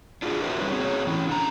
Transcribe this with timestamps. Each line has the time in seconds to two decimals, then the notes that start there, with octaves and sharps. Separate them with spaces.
0.22 D4 F4 F#4 G#4 A#4 D5
0.42 F#4 A#4 C5 D5 E5
0.60 G3 C#4 D#4 B4 C#5
0.72 C4 F#4 G#4 A#4 C#5
1.07 E3 C#4 E4
1.29 D3 A#5